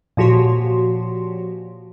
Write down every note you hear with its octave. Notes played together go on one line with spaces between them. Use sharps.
A#2 F3 F#4 G4 C#5 C6